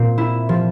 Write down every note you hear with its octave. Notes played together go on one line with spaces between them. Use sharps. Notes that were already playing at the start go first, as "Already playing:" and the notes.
Already playing: A#2 C4
E4
F3